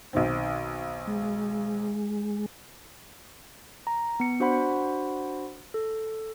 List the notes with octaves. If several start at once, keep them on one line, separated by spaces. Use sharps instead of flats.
B1 D#3 C4
G#3
A#5
B3 C#7
D4 F#4 C5 F#5 B5
A4